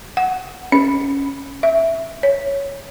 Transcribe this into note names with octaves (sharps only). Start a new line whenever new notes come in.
F#5
C#4
E5
C#5